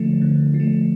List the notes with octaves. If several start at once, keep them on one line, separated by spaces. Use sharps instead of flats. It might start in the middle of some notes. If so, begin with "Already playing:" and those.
Already playing: D3 F3 A3
D3
F3
A3